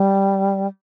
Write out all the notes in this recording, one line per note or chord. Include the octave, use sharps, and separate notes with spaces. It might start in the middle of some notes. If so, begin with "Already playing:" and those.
Already playing: G3